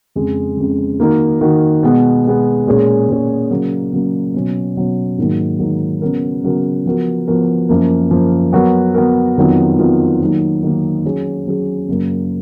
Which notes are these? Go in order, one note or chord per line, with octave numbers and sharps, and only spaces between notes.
F2 C#3 G#3
F2 C#3 G#3
D#3 A#3 D#4 F#4 A#4
D#3 A#3 D#4 F#4 A#4
B2 G#3 B3
B2 G#3 B3
A#2 G#3 C#4 G#4
A#2 G#3 C#4 G#4
C#3 F#3 A#3
C#3 F#3 A#3
B2 F#3 C#4
B2 F#3 C#4
G#2 D#3 F#3 A#3
G#2 D#3 F#3 A#3
C#3 F#3 B3 F#4 A#4
C#3 F#3 B3 F#4 A#4
F3 B3 F#4 A#4
F3 B3 F#4 A#4
F#2 F3 A#3
F#2 F3 A#3
F#3 B3 F#4 A#4
F#3 B3 F#4 A#4
F2 D#3 F#3 B3 F4
F2 D#3 F#3 B3 F4
D#3 F#3 A#3 D#4
D#3 F#3 A#3 D#4
F#3 C#4 G#4
F#3 C#4 G#4
F#2 C#3 F#3 A#3